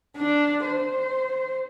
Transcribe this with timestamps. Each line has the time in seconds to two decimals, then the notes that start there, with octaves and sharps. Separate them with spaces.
0.17 D4
0.64 C5